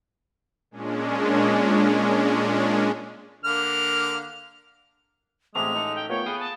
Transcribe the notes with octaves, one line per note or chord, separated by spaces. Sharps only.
A#2 G#3 C#4 D4
D3 A#3 F6
A1 G#3 A3 C4 G#4 D6 F7
D#4 A4
G5
A3 B3 F4 A#4 C#5 G5
B3 G#4 F5 D#6
A5